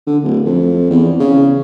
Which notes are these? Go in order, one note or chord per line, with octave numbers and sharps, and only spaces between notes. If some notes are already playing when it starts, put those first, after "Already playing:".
D3
D1
F2
E2
C#3